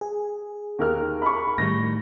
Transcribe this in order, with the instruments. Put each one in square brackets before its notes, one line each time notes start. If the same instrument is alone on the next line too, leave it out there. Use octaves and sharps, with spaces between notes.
[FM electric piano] G#4
[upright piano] D#2 A#4 F6
B5 C#6
[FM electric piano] A2 D#3 G3 [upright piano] A#6